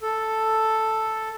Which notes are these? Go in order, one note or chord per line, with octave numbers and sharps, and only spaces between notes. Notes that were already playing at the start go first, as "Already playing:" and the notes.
A4